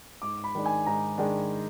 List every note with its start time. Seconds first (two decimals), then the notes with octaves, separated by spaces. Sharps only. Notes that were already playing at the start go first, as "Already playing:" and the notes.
0.22 G#2 D6
0.44 B5
0.55 D#3 G#3 D4
0.66 G#5
0.86 G#2 A#5
1.18 D#3 G#3 D4